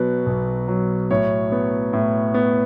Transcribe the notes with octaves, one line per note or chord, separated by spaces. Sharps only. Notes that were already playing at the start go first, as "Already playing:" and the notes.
Already playing: B2 F#3 B4
B1
F#3
A2 C#5
B3
A2
B3